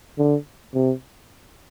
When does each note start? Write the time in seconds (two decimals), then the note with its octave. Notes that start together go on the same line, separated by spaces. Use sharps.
0.18 D3
0.74 C3